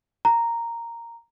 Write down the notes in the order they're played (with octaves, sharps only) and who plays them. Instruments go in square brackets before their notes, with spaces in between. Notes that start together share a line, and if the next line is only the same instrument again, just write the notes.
[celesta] A#5